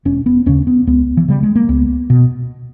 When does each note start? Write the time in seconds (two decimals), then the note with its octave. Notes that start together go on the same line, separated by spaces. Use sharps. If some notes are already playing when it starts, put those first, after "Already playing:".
0.05 E1 C#4
0.26 B3
0.46 D#2 C#3 C#4
0.67 B3
0.87 C#2 B3
1.17 E3
1.28 C#3 G3
1.43 G#3
1.56 A#3
1.69 C#2 B3
2.10 B2